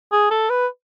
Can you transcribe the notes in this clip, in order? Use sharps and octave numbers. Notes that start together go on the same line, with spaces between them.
G#4
A4
B4